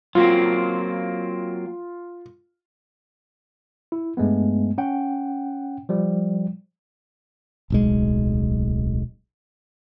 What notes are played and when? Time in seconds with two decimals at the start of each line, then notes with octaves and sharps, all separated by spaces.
0.15 F#3 A#3 C4 F4
3.92 E4
4.17 G2 G#3 A3 B3
4.78 C#4 F#5 G5
5.89 F3 G3
7.70 D1 B1 G#3